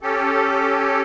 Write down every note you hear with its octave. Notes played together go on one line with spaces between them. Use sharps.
C#4 G4 A4